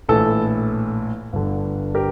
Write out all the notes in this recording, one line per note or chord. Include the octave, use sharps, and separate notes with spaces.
A#1 A2 E3 A4
G1 G2 D3
G4 A#4